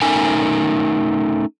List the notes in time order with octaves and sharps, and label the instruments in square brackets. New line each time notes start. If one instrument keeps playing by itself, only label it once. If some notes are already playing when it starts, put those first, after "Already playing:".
[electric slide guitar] A3 C#4 D#4 A#4 G#5